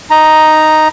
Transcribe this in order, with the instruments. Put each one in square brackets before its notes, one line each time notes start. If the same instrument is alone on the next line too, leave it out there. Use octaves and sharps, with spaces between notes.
[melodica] D#4 A#5